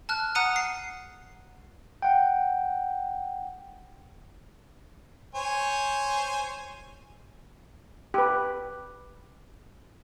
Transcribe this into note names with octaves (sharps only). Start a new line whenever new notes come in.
A5 F6 F#6
F#5 A#5 D#6 F#6 C#7 D#7
C7
F#5 G5
C5 C#5 G#5
G4 B4